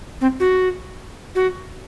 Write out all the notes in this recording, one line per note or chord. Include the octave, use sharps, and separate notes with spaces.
C4
F#4
F#4